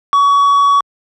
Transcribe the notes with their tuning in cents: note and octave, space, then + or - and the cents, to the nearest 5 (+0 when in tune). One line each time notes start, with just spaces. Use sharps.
C#6 +30